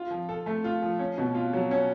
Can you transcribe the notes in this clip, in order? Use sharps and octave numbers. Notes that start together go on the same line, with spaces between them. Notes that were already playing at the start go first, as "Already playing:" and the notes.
Already playing: F4
F3
A4
A3
F4
F3
C#4
B2
F4
F#3
C#4